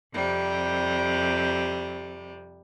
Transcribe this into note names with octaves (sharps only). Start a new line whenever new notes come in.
F2 C3 G3